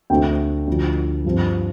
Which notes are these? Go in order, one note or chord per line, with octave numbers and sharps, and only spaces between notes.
D2 D3 A3 C4 G5
D2 D3 F3
G2 F3 C4